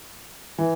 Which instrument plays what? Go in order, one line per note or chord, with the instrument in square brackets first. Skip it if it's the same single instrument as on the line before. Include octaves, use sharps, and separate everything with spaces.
[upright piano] E3